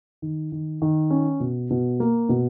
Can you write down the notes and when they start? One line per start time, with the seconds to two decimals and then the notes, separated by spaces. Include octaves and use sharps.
0.22 D#3
0.52 D#3
0.82 D#3
1.10 C#4
1.40 B2
1.71 B2
2.00 A#3
2.29 B2